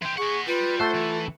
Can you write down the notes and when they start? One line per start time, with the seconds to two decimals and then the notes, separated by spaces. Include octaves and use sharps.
0.02 E3 G4 C6
0.17 G#4 D#5 F#5 C#6
0.47 G3 F4 B4
0.80 A3 A4 C5 F#5
0.95 E3